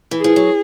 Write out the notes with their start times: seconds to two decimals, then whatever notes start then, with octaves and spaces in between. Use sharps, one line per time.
0.11 E3
0.19 G#4
0.24 F3
0.36 F#3